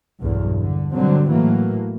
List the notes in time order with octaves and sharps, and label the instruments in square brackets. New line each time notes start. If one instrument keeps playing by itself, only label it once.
[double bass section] B1 E2 G2
D3
B2 D3 F#3 G3 C4
A2 E3 F#3 A3 A#3